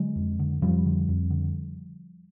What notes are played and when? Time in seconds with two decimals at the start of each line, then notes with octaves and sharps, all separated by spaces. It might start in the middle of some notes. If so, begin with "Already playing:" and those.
Already playing: D3 F#3 G#3
0.16 F2
0.39 D3
0.62 F2 F3 G3
0.85 D3
1.09 F2
1.30 D3